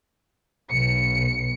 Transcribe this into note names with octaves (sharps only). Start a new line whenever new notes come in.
B1 C#7